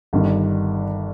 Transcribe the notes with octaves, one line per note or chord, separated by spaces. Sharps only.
G1 G2 D#3